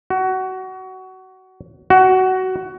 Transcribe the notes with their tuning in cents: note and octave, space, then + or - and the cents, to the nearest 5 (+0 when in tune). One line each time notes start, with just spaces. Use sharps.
F#4 +20
F#4 +15